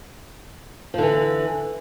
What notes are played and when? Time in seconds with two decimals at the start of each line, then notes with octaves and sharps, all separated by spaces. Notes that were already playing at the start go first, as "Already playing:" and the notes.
0.94 F3
0.98 D3
1.03 E3